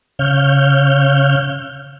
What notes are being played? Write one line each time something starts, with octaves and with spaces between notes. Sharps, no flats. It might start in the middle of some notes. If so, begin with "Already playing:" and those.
C#3 C#5 F5 F6 G6